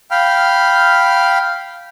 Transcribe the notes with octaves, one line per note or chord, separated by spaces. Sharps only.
F5 G5 B5 F6